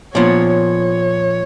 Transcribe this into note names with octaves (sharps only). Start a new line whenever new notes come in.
A#2 F3 B3 C#5
C#5